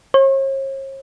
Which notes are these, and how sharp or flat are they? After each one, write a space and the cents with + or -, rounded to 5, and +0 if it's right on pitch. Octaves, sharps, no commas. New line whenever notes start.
C#5 -45